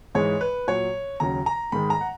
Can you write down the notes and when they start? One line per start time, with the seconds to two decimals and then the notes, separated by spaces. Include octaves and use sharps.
0.15 G#2 E3 G#3 C#5
0.41 B4
0.68 A#2 F#3 C#5
1.20 D#2 C#3 F#3 A#5
1.46 A#5
1.72 G#2 D#3 G#3 B5
1.90 A#5
2.01 F#5